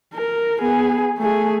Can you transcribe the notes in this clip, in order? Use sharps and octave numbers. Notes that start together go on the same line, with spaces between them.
A#4
B3 G#4
A3 G#4